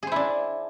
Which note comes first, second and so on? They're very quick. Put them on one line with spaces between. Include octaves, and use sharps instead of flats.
G#4 C5 E4 D4